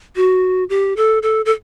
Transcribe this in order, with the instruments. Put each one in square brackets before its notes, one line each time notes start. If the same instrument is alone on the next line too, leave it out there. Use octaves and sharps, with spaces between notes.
[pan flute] F#4
G4
A4
A4
A4